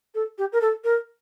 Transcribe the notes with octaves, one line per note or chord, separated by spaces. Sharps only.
A4
G4
A#4
A4
A#4